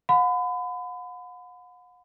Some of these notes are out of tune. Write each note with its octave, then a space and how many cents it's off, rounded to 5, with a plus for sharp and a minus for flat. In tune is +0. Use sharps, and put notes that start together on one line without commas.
F#5 -40 B5 +35